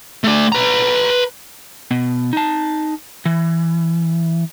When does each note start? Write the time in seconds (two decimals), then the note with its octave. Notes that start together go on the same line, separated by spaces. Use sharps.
0.24 A3 D5
0.52 B4 A#5
1.91 B2
2.33 D#4 A5
3.25 E3